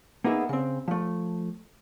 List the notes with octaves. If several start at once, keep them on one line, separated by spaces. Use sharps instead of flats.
A#3 B3 D#4 G#4 E5
C#3 C4
F3 A3